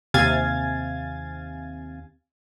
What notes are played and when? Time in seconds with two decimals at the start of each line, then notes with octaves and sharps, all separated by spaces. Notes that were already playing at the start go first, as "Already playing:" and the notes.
0.14 D#2 C3 F5 G#5 G#6 A6